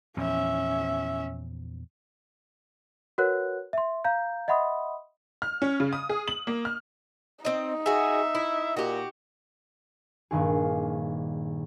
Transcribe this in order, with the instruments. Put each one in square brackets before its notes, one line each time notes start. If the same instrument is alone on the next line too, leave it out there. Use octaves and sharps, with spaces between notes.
[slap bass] E2 A#2 F3 [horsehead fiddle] C#4 E5
[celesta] F#4 A#4 B4 C#5 F#5 F#6
E5 C6
F5 A#5 G6
D#5 E5 F#5 B5 C6 D#6
[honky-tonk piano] F6
C#4
C#3
D#6
G#4
F#7
A#3
F6
[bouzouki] C4 D#5 [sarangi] D#4
[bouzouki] F#4 G#4 [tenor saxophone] E5
[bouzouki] E4
[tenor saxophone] A#2 [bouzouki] F#4 G4
[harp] A#1 G2 D#3 G#4